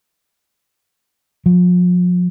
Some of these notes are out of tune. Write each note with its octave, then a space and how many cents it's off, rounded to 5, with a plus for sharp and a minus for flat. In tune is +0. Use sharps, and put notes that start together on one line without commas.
F3 +40